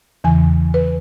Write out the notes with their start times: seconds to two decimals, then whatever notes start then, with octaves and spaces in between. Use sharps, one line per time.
0.24 E2 C#3 E3 G#5
0.74 B4